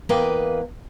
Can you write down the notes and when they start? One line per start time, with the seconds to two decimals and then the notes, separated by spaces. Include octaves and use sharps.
0.09 E2 A#3 B4 D#5 F5 G5